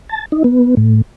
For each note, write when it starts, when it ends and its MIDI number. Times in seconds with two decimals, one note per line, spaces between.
0.09 0.25 81
0.32 0.43 63
0.44 0.75 59
0.77 1.02 45